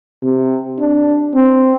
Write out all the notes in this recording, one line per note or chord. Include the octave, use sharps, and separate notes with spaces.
C3
D4
C4